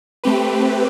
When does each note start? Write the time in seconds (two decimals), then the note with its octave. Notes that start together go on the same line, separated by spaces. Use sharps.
0.24 A3 C4 G4 B4